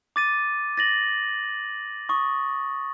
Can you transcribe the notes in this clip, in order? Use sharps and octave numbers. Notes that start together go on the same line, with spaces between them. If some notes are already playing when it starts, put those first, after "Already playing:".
D6 A6 D#7
A6 A#6 F#7
C#6 D#6